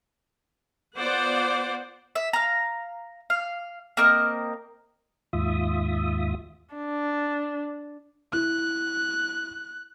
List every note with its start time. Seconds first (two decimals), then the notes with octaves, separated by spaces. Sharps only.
0.97 B3 F4 C5 D5 F#5
2.15 E5
2.33 F5 A#5
3.30 F5
3.97 A#3 C4 A#4 D#5
5.33 D#2 G#2 F4 E5 D#6
6.75 D4
8.33 E4 F#6